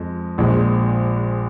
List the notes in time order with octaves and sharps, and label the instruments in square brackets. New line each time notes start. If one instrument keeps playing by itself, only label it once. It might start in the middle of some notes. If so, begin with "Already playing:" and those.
Already playing: [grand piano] F2 F3 G#3
A#1 A#2 F3 G#3